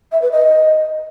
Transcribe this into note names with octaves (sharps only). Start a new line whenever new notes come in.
E5
B4
D#5